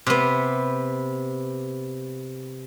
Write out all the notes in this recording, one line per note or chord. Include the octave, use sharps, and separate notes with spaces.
C3 B3